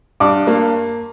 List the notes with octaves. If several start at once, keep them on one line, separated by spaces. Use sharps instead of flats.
G2 D6
A#3